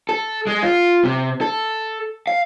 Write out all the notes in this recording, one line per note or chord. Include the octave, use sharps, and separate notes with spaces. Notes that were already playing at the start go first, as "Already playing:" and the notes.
A4
G#3
F4
C3
A4
F5